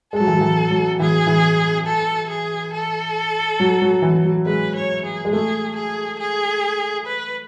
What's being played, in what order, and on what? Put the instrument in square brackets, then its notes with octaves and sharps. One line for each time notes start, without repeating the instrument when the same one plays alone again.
[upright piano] G#3 [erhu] A4
[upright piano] F#3
E3
F#3
E3
F#3
[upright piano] E3 [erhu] G#4
[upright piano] E3
[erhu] A4
G#4
A4
[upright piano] F#3
F#3
E3
F#3
[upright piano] G#3 [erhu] B4
[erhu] C#5
G#4
[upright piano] G#3
[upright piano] A3 [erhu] G#4
[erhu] G#4
G#4
B4